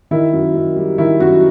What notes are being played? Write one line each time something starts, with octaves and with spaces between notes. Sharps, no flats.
D#3 E4
F#2
F#2
G3
D#3 E4
F#2 F#4